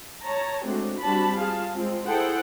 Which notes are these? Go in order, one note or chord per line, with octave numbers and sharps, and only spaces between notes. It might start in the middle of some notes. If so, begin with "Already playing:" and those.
C#5 A5 A#5
G#3 A3 C4 D4 F#4
G3 C4 D4 F#4 A5 B5
F4 G#4 F5 A5
G#3 C4 F4
E4 G#4 A4 C5 F#5 G5